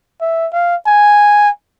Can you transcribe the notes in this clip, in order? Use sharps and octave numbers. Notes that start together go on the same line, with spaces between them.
E5
F5
G#5